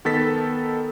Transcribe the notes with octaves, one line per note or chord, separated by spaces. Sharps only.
D#3 B3 A4 A6 B6